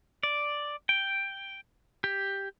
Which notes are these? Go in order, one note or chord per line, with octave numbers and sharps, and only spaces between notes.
D5
G5
G4